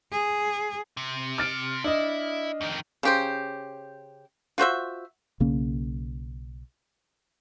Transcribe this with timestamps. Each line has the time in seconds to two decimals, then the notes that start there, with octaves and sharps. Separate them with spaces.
0.12 G#4
0.97 C3
1.38 F6 A6 D7
1.84 D4 E4 D#5
2.61 F2 D#3
3.03 C#3 G4 C5
4.58 F4 F#4 C5 E5
5.40 B1 C#3 A#3 C#4